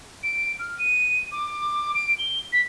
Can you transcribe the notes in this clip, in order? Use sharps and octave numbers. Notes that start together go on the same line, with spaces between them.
D7
F6
D#7
D6
D7
G7
B6